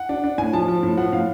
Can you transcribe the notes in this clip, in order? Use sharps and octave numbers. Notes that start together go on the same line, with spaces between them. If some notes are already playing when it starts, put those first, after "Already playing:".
Already playing: F#5
D4
D4
A2 G#5
F3 A5
F3
A2
F3 F#5
A2 F5